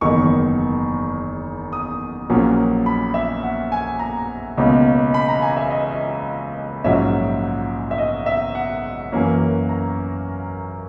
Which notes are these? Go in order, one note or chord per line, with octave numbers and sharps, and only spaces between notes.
F#1 E2 D#3 C#6
D#6
A#1 A#2 F#3 A#3 C#4
B5
E5
F#5
G#5
A#5
C#2 B2 A#3 C#4
B5
A#5
G#5
E5
D#5
A#1 G#2 F#3 C#4 E5
E5
D#5
E5
F#5
F#2 E3 A#3 C#4
A#5